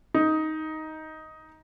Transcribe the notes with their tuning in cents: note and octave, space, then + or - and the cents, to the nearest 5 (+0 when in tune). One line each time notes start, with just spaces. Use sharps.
D#4 +10